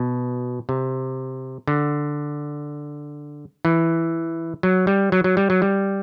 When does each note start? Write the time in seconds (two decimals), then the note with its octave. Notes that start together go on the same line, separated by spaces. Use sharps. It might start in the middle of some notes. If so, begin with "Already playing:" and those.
Already playing: B2
0.69 C3
1.67 D3
3.65 E3
4.63 F#3
4.87 G3
5.12 F#3
5.24 F#3
5.37 G3
5.50 F#3
5.62 G3